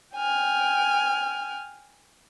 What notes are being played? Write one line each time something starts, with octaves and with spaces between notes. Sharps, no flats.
G5 G#5 F6